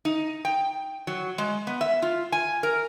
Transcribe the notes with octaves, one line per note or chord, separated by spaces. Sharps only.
D#4
G5
F#3
G#3
B3
E5
F4
G#5
A#4